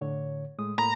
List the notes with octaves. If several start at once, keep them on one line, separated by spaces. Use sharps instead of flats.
A2 D3 C#5
A2 G#3 D#6
A2 A#3 A#5 B5